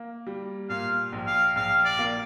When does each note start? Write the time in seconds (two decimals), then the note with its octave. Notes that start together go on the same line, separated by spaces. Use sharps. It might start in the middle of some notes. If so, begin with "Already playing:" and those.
Already playing: A#3
0.27 G3
0.69 A#2 F5
1.12 A#1
1.27 F5
1.56 A#1 F5
1.85 D5
1.99 A#3